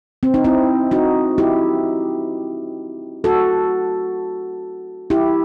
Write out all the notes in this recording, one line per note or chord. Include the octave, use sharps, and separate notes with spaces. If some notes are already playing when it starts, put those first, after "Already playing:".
C4
D#4
C4 E4
D#4 F#4
E4 G4
F#4 A4
E4 G4